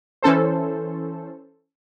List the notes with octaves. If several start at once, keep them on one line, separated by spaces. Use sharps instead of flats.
E3 C#4 A4 C5